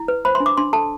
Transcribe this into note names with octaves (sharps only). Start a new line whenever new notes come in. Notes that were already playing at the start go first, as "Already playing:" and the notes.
Already playing: E4
B4
C5 B5
C6
D4
D6
D4 C6
A4 A5